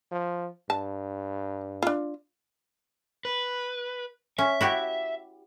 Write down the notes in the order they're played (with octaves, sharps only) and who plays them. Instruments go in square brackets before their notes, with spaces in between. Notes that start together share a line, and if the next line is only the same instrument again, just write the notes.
[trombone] F3
[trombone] G2 [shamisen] A5
[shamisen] D4 F4
[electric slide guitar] B4
[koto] C#4 [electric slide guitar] E5
[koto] E4 F#4 G4